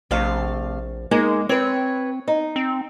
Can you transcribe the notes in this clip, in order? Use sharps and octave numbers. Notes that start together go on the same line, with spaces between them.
A#1 C3 A3 F5
G#3 A#3 D#4 G#4
C4 B4 C#5
D#4
C4